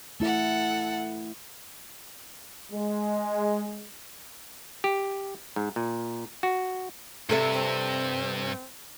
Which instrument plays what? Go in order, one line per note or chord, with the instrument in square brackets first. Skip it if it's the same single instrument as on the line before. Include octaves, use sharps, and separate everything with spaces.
[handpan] A3 E4 E5 [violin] A4 F#5
[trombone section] G#3
[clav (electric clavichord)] G4
G#2
A#2
F#4
[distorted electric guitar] G2 [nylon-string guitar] C3 A4 E5
[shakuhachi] C4